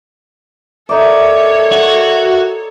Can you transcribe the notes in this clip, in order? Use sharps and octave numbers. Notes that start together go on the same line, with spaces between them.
D#4 A4 A#4 C#5 D5 E5
F#4